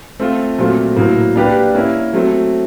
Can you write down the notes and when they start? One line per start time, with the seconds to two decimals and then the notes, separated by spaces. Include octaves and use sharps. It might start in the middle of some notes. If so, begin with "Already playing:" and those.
0.20 A3 C4 F4
0.58 A#2 F#3 A3 C4 F4
0.96 A2 F#3 A#3
1.36 A#3 D4 G4 B4 D5
1.74 A#3 C#4 E4
2.13 F#3 A3 C4